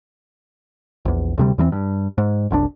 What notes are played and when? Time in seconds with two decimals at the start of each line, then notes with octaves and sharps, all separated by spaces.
1.05 A#1 E2
1.38 D2 C3 G3
1.58 E2 E3 G3 C4
1.72 G2
2.18 G#2
2.50 F#1 C2 C3 D4